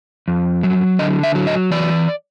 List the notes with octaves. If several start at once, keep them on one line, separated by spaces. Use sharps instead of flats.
F2
F#3
D3 D#5
E5
F#3
D#5
E3 D5